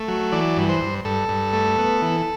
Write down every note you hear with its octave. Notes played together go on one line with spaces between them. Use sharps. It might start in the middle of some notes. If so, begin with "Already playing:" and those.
Already playing: A3
F#3
E3 D5
G2
C5
G2
G2 A4
G2
A3
B3
E3